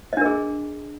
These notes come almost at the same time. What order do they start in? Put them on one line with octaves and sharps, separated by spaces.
D#5 D4 A#4 G#4